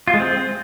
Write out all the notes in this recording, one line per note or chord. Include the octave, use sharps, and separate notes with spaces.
F4
G#3
C4